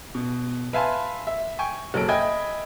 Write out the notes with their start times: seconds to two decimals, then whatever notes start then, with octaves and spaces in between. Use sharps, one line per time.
0.15 B2
0.73 B4 E5 F5 G#5 A5 C6
1.27 E5
1.59 G5 G#5 C#6
1.94 F#1 F#3 A4 D7
2.08 D#5 E5 G5 G#5 B5 G#6